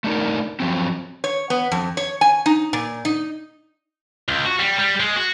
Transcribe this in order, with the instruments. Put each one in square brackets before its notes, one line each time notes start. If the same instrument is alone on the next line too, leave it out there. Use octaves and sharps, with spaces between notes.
[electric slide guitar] A3 D4 D#4 A#4
F3 F#3 C4
[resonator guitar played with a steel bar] C#5
B3
F2
C#5
G#5
D#4
A#2
D#4
[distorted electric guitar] C#2
F#4
G3
G3
G#3
F#4